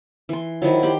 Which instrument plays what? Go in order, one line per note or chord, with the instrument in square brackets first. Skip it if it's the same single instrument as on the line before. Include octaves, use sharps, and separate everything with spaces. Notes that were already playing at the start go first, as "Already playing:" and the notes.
[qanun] E3 C6
[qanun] D#3 F3 F#3 [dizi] E4
[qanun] G4 B5 C6